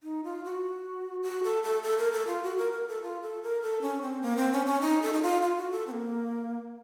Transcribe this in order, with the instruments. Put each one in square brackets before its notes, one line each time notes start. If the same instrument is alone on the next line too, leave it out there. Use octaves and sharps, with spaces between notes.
[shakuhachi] D#4
F4
F#4
F#4
A4
A4
A4
A#4
A4
F4
F#4
A#4
A#4
A4
F4
A4
A#4
A4
C#4
C4
A#3
C4
C#4
C#4
D#4
A4
D#4
F4
F4
F#4
A4
C4
A#3